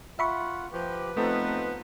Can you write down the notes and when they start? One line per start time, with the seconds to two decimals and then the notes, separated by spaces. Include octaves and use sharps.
0.19 F4 E5 F#5 B5 C#6
0.73 F3 G4 B4
1.16 F3 A3 B3 C4 D#4 A4